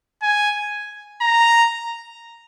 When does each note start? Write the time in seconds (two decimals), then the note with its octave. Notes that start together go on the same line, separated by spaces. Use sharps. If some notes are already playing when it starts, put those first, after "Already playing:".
0.23 G#5
1.21 A#5